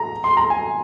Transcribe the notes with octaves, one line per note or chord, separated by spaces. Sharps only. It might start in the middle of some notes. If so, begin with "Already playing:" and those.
Already playing: A#5
C6
A#5
G#5